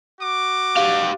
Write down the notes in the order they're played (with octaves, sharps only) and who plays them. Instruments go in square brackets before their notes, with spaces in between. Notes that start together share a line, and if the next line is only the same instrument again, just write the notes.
[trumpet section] F#4 D6
[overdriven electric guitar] G4 F5